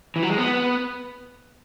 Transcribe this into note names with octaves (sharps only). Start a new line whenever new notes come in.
E3
F#3
G#3
B3